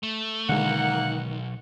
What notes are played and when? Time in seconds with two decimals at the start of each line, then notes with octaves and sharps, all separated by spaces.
0.03 A3
0.49 B1 D3 D#3 G#3 A#3 F#5